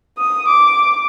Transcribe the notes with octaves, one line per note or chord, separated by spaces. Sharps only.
D#6
D6